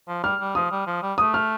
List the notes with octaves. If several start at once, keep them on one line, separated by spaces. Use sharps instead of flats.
F3
G3 F6
G3
F3 D#6
G3
F3
G3
A3 D#6
F6